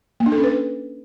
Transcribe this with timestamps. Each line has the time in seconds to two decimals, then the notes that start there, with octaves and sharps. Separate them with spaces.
0.20 A#3
0.26 D4
0.32 A4
0.38 C#4
0.44 B4